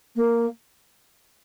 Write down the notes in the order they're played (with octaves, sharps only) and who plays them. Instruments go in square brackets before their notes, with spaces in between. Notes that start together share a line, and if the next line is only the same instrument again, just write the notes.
[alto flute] A#3